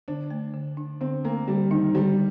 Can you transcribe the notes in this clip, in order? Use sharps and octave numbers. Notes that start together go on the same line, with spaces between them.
D3 D4
A3
D3
D4
D3 C4
A3 A#3
D3 G3
D#3 D4
D3 G3